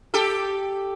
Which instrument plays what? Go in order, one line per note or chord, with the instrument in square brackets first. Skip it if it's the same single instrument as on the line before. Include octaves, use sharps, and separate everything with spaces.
[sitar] G4 A4